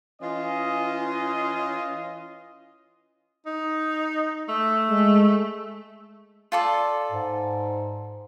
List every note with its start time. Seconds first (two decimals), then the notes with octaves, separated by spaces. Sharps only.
0.21 E3 C#4 F4 D#5
3.46 D#4
4.49 A3
4.90 G#3
6.52 F4 A4 D5
7.12 G#2